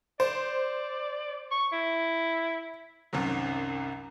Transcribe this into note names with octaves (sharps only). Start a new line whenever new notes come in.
C5 D5
C#6
E4
C2 F#2 C3 D#3 F#3